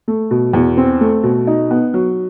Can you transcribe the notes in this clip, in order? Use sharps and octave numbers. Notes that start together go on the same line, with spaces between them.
A3
B2
E2
C4
A3
B2
D#4
B3
F#3